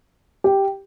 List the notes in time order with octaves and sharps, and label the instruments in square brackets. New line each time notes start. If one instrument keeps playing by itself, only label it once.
[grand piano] G4